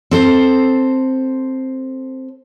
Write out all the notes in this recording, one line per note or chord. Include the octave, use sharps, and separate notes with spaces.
C4 A4 C5